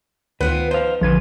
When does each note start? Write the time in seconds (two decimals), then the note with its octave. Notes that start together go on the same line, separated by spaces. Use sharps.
0.41 D2 D#3 B3 C4 F4 B4 F#6
0.71 D#4 C5 F5
1.01 A#1 D3 F3 B4 G#6